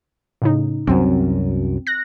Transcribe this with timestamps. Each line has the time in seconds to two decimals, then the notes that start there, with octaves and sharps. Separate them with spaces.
0.42 A2 C#3 D#4
0.87 C2 F#2 F#3 C4
1.87 F#6 A#6